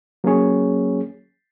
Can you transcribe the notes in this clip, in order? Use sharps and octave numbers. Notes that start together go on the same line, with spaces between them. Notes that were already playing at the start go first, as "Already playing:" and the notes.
F#3 A#3 C#4 G#4 C#5